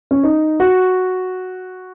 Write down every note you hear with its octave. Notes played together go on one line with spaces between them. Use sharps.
C#4
D#4
F#4